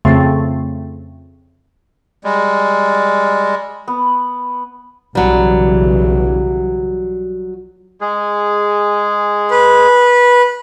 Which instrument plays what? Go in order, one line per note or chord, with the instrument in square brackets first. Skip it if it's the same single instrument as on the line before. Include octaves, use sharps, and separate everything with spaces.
[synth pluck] F2 C#3 A3 C4
[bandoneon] G3 G#3
[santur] B3
[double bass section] B1 C#3 E3 [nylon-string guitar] F#3 G3
[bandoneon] G#3 G#4
[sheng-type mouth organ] B4